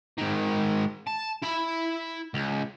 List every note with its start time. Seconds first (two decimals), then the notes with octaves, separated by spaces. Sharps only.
0.18 G#2 D#3
1.07 A5
1.43 E4 B5
2.34 C#2